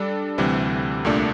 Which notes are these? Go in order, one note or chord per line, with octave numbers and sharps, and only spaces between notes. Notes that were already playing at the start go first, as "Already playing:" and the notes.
Already playing: G3 D4 A4
D2 C3 E3 G3
C2 A#2 A3 D4